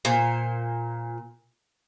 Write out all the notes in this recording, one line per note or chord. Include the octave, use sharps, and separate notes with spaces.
A#2 C5